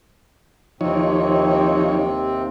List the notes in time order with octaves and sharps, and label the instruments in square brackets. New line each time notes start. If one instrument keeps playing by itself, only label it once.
[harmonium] D#2 C3 C4 [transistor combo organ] F3 D#4 C#5